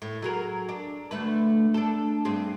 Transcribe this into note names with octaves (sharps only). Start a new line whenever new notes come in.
A2
F#3 G#4 A#4
D4
D2 A3 B4
D4 A4
G2 C4 G#4